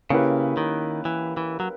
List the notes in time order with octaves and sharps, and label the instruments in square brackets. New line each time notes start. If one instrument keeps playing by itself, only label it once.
[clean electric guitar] C#3 [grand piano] A#3 C#4 E4 G4 B4
[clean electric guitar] D#3
E3
E3
F#3